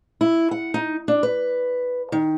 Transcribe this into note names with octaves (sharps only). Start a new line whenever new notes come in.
E4
F#5
D#4
D4
B4
D#3